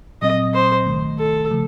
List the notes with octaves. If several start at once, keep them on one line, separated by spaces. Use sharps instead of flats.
A#2 F#3 C4 D#5
C5
C2 C3 D#3 A3
A4
C#3 F3 A3